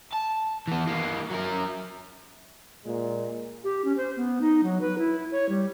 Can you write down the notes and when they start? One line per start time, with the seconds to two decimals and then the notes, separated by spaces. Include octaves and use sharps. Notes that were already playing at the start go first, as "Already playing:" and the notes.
0.13 A5
0.68 E3 B3
0.87 E3 A#3
1.30 F#3 A#4
2.84 A#2 G#3
3.64 G4
3.85 C#4
3.97 C5
4.17 B3
4.41 D#4
4.63 F#3
4.81 B4
4.98 E4
5.32 C#5
5.49 G3